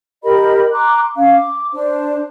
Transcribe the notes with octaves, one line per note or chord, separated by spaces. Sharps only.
G4 A#4 D#5 B5
A#5 C6 D6 F#6
C#4 F5
D6
D4 C5